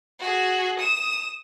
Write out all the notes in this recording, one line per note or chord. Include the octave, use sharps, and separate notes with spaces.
F#4 G#4
D#6 E7